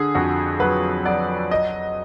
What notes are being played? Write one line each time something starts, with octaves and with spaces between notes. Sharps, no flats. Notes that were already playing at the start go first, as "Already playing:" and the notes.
Already playing: D3 G#4
F2 F#4
F#3 B4
F#3 D5
D#5